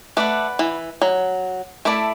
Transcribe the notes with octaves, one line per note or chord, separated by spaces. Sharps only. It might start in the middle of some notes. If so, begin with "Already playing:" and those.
A3 B4 D5 F#5
E3
F#3
A3 E4 D5 A5